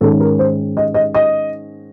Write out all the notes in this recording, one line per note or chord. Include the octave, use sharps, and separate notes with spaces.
G#2 D#3 G#3 C#4 A4
A#4
C5
D#5
D#5
D#5